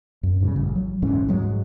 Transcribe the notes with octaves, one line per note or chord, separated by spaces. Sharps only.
F#2
G2 A#2 C#3 G3
A1
F#3
A#1 G#2 E3 C#4
G#2 F#3 G#3